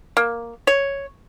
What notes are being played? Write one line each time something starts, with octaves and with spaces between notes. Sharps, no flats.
A#3
C#5